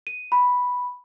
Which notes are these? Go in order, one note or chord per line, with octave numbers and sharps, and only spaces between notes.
D#7
B5